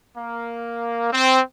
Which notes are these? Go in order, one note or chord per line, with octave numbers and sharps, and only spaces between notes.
A#3
C4